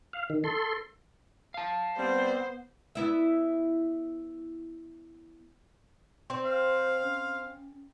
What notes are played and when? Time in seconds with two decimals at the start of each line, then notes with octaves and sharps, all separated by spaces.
0.13 F5
0.30 D#3
0.44 A4 C6
1.54 F5 A5
1.97 G3 B3 C4 C5
2.95 B3 E4 E5
6.30 C4 C5
6.45 F5
7.03 C#4